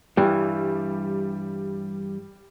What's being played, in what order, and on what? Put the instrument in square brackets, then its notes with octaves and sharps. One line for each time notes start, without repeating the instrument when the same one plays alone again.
[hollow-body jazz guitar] G2 E3 [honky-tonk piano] G3